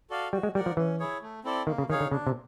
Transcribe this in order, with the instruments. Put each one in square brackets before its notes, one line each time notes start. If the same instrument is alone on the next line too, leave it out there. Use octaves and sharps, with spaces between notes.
[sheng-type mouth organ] F#4 A4 D5 F5
[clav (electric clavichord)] G3 [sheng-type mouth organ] F#4
[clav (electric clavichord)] G#3
[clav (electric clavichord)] G3 [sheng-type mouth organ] A#4 D5 F#5
[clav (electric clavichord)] F3
[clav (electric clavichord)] E3 [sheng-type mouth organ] C#4
[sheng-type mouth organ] E4 G#4 C#5
A3
C4 E4 A4 D5
[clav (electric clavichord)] D#3 [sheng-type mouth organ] A#3
[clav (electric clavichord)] C#3
[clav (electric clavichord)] D#3 [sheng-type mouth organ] D#4 G#4 C#5 F5
[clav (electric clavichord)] D3
[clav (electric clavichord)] C#3 [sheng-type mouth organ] D4
[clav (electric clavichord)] C3